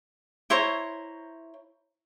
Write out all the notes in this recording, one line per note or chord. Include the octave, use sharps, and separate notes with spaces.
E4 C5 C#5 A#5